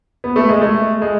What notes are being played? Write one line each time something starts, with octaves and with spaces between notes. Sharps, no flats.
B3
A3
G#3
A3
G#3